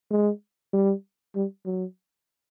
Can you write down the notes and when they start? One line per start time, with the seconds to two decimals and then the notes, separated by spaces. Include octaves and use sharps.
0.11 G#3
0.73 G3
1.36 G3
1.66 F#3